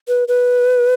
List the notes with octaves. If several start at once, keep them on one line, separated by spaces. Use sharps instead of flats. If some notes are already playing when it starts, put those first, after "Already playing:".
B4
B4